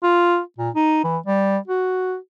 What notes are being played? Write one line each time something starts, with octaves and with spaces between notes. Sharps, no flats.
F4
A#2
D#4
E3
G3
F#4